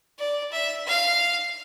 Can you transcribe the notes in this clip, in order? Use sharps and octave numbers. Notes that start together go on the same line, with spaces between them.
D5
E5
F5